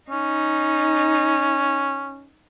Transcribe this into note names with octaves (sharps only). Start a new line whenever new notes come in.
C#4 D#4